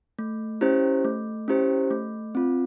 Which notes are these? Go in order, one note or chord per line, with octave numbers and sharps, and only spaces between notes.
A3
C#4 E4 G4 C5
A3
C#4 E4 G4 C5
A3
C4 F4